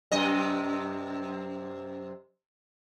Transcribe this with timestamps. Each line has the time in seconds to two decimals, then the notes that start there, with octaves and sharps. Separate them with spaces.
0.12 F#2 C3 D#5